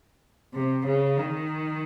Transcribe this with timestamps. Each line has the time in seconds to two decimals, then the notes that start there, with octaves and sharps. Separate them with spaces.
0.54 C3
0.86 C#3
1.17 D#3